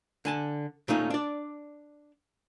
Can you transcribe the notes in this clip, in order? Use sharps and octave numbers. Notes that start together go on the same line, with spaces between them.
D3 G#5 A5
A#2 A3 C#4 D#4 F4
D4 D5